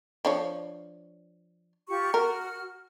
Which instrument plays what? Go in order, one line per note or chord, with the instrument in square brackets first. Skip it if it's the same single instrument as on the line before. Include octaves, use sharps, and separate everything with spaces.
[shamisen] F3 D4 C#5
[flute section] F4 G4 C#6
[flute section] F#4 F6 [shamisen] A#4